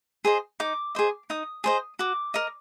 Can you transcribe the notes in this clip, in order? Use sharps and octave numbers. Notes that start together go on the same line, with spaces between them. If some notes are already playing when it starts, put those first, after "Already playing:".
G#4 C5 D#5
D#4 D6
G#4 C5 D#5
D#4 D#6
G#4 C5 D#5
F#4 D6
A#4 D#5